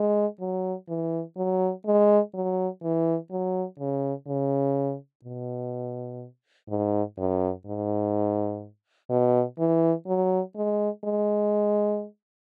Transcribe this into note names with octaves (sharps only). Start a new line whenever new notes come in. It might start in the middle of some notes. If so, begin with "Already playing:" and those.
Already playing: G#3
F#3
E3
F#3
G#3
F#3
E3
F#3
C#3
C#3
B2
G#2
F#2
G#2
B2
E3
F#3
G#3
G#3